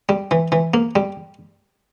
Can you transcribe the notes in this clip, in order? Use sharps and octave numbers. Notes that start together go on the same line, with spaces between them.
G3
E3
E3
A#3
G3